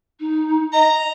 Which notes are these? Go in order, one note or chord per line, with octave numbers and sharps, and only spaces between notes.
D#4
D#5 A#5